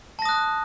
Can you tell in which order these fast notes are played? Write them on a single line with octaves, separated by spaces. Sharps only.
A5 A#6 D#6 F#6